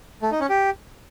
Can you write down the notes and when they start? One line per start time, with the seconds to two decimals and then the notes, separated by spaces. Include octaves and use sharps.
0.22 A3
0.31 D#4
0.40 C#4
0.49 G4